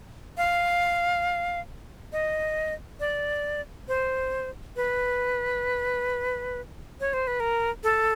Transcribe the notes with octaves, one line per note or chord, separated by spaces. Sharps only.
F5
D#5
D5
C5
B4
C#5
C5
B4
A#4
A4